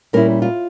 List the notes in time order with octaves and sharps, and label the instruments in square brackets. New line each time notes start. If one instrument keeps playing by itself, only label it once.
[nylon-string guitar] A#2 G3 C#4 E4 A#4
F4